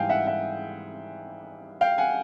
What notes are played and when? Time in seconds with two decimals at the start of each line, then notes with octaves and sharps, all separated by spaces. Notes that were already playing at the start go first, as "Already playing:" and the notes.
Already playing: G#2 E3 G3 F5 G5 G#5
0.09 E5 F#5
0.27 E5 F#5
1.81 F5 G5
1.98 F#5 G#5